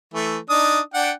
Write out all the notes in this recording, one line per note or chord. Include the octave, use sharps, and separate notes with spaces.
E3 A3
D4 D#4 D#6
D4 F#5 G5